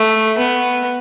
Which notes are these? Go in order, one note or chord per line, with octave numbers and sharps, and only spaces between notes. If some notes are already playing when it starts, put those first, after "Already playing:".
Already playing: A3
B3